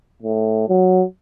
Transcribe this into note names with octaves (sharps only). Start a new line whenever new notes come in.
A2
F#3